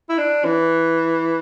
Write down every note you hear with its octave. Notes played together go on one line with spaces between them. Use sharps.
E4
D4
E3